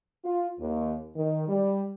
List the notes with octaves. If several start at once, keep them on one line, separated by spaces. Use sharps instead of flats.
F4
D#2
D#3
G3